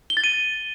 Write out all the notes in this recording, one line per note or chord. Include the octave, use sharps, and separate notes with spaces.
G7
A6
D#7